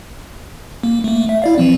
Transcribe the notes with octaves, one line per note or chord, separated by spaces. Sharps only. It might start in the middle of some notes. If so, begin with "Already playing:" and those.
A#3
A3 A#3
E5
E4 D5 F5
E3 F3 C4